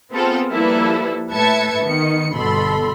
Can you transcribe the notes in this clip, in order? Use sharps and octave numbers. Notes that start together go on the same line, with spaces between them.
B3 C4 F4 G#4 A4
F3 G3 A#3 E4 A4 B4
A2 B4 E5 A5 G#6 C#7
D#3 B3 C#7
G1 B2 A4 B5 C6